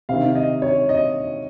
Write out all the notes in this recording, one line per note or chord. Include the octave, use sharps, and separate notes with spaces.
C3 D#3 F5
D#5
C#5
D#5